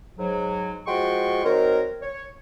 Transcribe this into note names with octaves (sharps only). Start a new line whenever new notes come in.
G#2 F#3
F3 G#3 F#4 G5 C6 C#6
F#3 C4 D#4 A#4
C#5